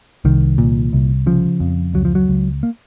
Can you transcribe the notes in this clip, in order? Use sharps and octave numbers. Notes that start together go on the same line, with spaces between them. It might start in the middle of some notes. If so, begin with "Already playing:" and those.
C2 D#3
A#2
C2
C#3 F3
F2
C#2 F#3
F3
F#3
C#2
A#3